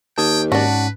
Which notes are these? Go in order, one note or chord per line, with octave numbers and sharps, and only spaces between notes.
D#2 G5 A5 D#6 G#6
G#2 C#4 D4 F#4 B4 A5